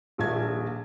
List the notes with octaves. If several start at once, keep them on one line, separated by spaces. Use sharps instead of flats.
D#1 A#1 F3 E5 G#6